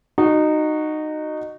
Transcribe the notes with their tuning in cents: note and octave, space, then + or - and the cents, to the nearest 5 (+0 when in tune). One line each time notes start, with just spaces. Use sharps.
D#4 -20 F#4 +0